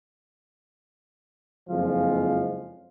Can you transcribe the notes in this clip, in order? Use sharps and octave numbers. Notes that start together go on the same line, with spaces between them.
F#1 F2 F3 G#3 F5